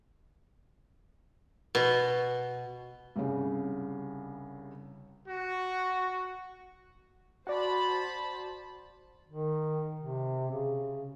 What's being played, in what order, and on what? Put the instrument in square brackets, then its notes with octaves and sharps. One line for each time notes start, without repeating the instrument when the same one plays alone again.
[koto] B2
[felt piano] C2 G2 C#3
[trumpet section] F#4
[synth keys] F#4 D5 [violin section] C5 A5 B5
[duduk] D#3
C3
C#3